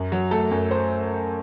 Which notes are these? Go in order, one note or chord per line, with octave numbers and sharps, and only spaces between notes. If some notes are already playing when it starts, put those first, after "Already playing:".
Already playing: F#2
F#3
A3 A4
F#2
C5